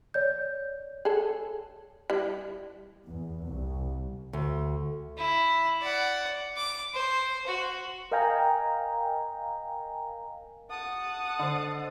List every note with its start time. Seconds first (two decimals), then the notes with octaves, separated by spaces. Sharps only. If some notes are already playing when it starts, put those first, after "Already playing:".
0.14 C#5 D5 G6
1.05 G#4 A4
2.10 G3 E4
3.06 E2
3.46 C2
4.33 D2
5.17 E4
5.81 D5 F#5
6.57 D6
6.94 C5
7.47 F#4
8.12 A#4 D#5 F5 G5 G#5 A#5
10.70 F#5 A5 D#6
11.39 D3 C5 D#5